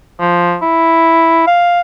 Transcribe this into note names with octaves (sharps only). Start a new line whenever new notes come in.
F3
E4
F5